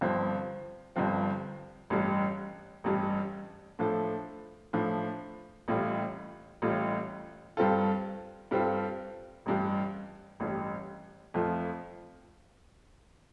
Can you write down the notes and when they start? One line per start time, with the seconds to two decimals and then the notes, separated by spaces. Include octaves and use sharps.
0.01 G1 G2 F3 C4
0.96 G1 G2 F3 C4
1.90 A1 G2 G3
2.84 A1 G2 G3
3.79 A2 F3 D4 A4
4.73 A2 F3 D4 A4
5.68 A1 A2 G3 F4
6.62 A1 A2 G3 F4
7.57 G2 G3 C4 F4 A4
8.51 G2 G3 C4 F4 A4
9.46 A1 G2 G3
10.40 A1 G2 G3
11.34 F2 F3 A3 F4